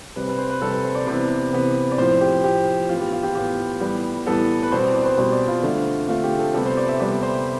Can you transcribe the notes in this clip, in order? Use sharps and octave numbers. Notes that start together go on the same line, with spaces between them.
C3 G3 C4 B4
B4
C5
B4
C3 G3 C4 A4
B4
C5
D5
C3 E3 B3
C3 E3 B3
D5
A2 F3 C4 C5
G4
A2 F3 C4 G4
A2 E3 B3 F4
G4
F4
G4
A2 E3 B3 G4
A2 E3 G3 B3
A2 E3 G3 B3 A4
B4
B2 G3 C4 C5
D5
D5
B4
C5
B2 G3 C4 C5
D5
F4
D3 A3 C4
D3 A3 C4 F4
G4
A4
C3 G3 B3 A4
C5
D5
E5
C3 G3 B3 D5
D5
C5